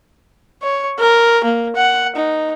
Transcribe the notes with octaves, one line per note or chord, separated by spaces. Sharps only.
C#5
A#4
A#3
F#5
D#4